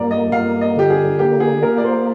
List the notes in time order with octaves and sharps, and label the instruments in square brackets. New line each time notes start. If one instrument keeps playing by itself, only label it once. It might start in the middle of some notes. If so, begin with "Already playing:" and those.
Already playing: [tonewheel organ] G2 A#3 [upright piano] D5 A#5
[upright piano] D#5
[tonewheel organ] G2 [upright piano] F5
[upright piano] D#5
[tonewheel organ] D3 [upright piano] G4
[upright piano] G#4
[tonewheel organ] A#3 [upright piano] G4
[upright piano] G#4
[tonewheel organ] A#3 [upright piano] A#4
[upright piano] D5
C5